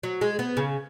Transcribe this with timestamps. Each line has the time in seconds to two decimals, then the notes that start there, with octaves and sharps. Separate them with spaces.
0.03 F#3
0.21 G#3
0.39 B3
0.57 C#3